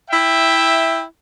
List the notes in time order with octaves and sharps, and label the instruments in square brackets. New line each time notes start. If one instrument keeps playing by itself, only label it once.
[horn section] E4 E5 G5